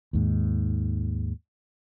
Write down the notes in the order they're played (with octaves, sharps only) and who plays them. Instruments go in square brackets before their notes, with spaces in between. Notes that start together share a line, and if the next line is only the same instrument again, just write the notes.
[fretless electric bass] D#2 G#2